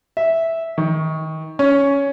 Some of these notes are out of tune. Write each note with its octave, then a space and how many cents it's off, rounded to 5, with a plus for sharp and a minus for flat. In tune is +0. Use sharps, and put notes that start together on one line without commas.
E5 -5
D#3 +25
C#4 +10